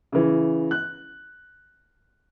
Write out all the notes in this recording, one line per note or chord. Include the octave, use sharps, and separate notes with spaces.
C#3 E3
F#6